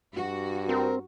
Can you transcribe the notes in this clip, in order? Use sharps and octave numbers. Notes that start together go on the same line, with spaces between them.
G2 F#4
C4 A#4